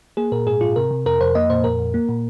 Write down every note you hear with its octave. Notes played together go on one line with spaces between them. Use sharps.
A#3 G#4
A#2 A#4
G#2 G#4
G#2 F4
C3 A#4
C3
F2 A#4
F2 C5
A#3 D#5
A#2 C5
F2 A#4
F2
A#3
A#2